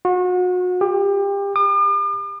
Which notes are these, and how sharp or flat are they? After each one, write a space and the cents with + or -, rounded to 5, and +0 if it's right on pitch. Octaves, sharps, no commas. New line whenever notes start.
F#4 -35
G4 +30
D6 +45